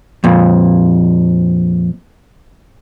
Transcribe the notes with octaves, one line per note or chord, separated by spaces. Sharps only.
F2 A#2